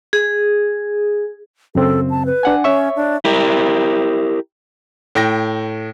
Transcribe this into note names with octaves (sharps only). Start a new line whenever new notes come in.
G#4
F#2 C#3 C4 A4
A5
B4
D4 F#5 G#5
C#4 C#5 E5 C#6
D4
E4 G4 A#4
A2 G5 A#6